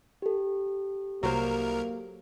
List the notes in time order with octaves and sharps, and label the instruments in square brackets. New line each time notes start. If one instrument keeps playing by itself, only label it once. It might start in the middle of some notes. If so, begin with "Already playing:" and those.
[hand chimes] G4 A4
[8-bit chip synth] C2 A#4 [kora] F#3 C5 [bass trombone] A#3